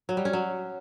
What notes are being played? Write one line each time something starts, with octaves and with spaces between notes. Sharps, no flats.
F#3
G3
C#4
F#3